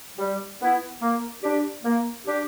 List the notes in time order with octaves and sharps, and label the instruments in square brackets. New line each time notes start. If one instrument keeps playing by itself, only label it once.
[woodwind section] G3
B3 E4
A#3
D4 G4
A#3
D4 G4